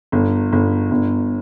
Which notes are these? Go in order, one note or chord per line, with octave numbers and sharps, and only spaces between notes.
G1
G1
G1